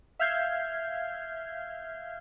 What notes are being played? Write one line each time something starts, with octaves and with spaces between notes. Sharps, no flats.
E5 F5 F6 G6 G#6 C7